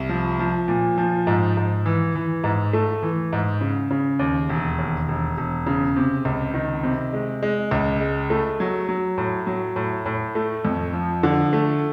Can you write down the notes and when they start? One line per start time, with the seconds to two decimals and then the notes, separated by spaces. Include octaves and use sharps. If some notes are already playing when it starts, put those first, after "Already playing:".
Already playing: C2
0.09 F3
0.39 F3
0.68 A#2
0.98 F3
1.27 G#2
1.57 G#2
1.86 E3
2.15 E3
2.44 G#2
2.73 A3
3.03 E3
3.33 G#2
3.61 C#3
3.91 C#3
4.19 D#2
4.49 E1
4.79 D#2
5.08 E1
5.37 E1
5.66 C#3
5.96 C3
6.25 C#2
6.54 D#3
6.83 C3
7.13 G#3
7.43 G#3
7.71 C#2
8.01 G#3
8.30 A3
8.60 F#3
8.89 F#3
9.18 A2
9.47 F#3
9.76 A2
10.06 A2
10.35 A3
10.65 F2
10.93 F3
11.23 D3
11.53 A3